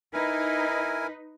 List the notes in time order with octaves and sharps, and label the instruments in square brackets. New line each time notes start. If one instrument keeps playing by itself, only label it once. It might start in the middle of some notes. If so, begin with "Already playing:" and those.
[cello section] D#4 B4 D#5 [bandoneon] E4 A#4 G#5